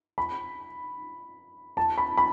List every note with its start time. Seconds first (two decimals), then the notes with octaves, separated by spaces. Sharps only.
0.18 B5
1.77 A5
1.98 B5
2.17 B5